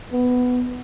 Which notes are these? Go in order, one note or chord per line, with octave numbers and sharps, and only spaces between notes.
B3